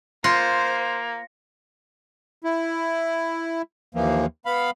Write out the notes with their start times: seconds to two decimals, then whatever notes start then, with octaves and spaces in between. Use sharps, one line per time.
0.24 A#3 F4 C5 A#6 C#7
2.44 E4
3.95 D#2 E3 F3 A#3
4.46 B3 F5 B5